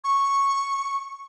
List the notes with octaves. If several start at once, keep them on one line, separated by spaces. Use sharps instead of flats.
C#6